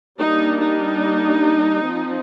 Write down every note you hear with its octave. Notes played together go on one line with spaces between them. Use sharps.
G3 A#3 D4 D#4
D#4
F3 C4